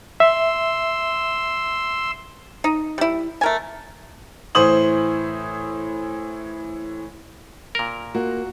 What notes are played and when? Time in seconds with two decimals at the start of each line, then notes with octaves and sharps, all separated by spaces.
0.20 E5 C6 E6
2.64 D#4
2.98 G3 E4
3.41 A3 A#4 G#5
4.55 A2 E3 C5 D#6 F#7
7.75 A#2 A#4
8.15 A#3 F4 F#4